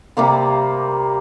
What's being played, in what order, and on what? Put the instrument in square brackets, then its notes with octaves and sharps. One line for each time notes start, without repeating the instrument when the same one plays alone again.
[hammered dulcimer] C3 G3 A#3 C4